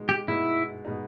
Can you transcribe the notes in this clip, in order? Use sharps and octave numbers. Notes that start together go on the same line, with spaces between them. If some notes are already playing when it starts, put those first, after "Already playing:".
Already playing: B2 G#3 D#4
G4
B2 G#3 D#4 E4
B2 G#3 D#4